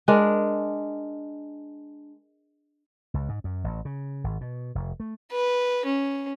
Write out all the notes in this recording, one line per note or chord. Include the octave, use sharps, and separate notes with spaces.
G#3 D4 A#4
C#2
G#2
F#2
A1
C#3
G#1
B2
F1
A3
B4
C#4